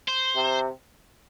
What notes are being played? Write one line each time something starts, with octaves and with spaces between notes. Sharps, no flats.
C5
C3